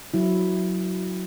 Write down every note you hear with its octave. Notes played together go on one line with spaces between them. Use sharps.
F#3 E4